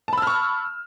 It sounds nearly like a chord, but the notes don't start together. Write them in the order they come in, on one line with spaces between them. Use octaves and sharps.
A5 B5 E6 F6 C#6